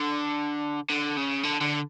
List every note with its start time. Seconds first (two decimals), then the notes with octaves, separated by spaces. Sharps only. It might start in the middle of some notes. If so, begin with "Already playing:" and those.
Already playing: D3
0.90 D3
1.17 C#3
1.44 D3
1.61 D3